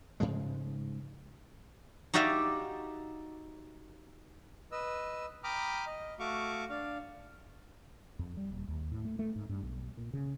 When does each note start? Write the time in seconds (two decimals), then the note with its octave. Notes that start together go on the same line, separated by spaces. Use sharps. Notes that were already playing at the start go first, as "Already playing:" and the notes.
0.20 G#2 C#3 F3 G#3
2.14 D#4 F#4 G4 D5 E5 F5
4.72 B4 D#5 E6
5.44 G5 A#5 B5 D6 D#6 F6
5.86 D#5
6.19 A3 F#4 F5 C#6 D6
6.69 D4 F5
8.19 F2
8.37 G3
8.52 D#1
8.68 D#2
8.92 A2
9.05 A3
9.19 A3
9.36 G#2
9.49 G2
9.63 B1
9.97 A#2
10.13 C#3